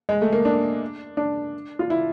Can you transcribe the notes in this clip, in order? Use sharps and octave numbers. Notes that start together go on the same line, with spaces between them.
G#3
A3
A#3
D4
D4
F4
E4